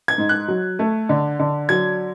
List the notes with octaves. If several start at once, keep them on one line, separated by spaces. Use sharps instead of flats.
G#6
G#2
F#6
F#3
A3
D3
D3
F#3 G#6